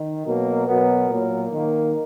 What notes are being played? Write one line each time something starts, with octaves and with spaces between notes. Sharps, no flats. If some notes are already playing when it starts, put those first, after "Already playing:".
Already playing: D#3
B2 F#3 A#3 A#4
B2 F#3 B3 A#4
A#2 F#3 A#3
D#3 A#3 A#4